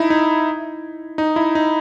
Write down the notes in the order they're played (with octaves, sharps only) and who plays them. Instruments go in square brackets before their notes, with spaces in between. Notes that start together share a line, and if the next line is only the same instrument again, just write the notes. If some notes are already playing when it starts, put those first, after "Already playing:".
Already playing: [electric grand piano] D#4 E4
D#4
D#4
E4
D#4